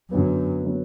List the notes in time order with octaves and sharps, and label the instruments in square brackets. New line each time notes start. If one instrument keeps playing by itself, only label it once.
[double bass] F#2 [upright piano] D3 F#3 B3
[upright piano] D3 F#3 B3